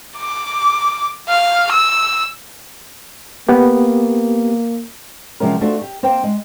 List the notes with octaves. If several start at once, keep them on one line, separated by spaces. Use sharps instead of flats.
D6
F5
E6
A#3 B3 G4
C3 F3 F#3 G#3 C#4 A#4
A3 C4 D4 F4 F#4
G4
A#3 C4 C5 F5 G5
G#3